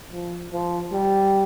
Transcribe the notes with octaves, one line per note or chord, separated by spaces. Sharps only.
F3
F3
G3